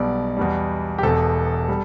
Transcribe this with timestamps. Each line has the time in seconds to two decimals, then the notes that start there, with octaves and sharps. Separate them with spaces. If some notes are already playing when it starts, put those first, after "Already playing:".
Already playing: B1 B2 G3 D5
0.37 E2 B2 G3
0.98 G4
1.03 E1 E2 B2 A4
1.68 G3